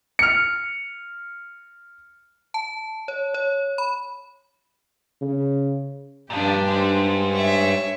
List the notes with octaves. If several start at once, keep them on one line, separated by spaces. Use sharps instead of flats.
F6 C#7
A5
C#5
C#5
B5
C#3
G2 A#2 F3 D4 G4
G#3 C5
C#5 E5